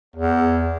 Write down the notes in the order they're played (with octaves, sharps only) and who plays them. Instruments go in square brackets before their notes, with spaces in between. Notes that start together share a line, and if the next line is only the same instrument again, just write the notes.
[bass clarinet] E2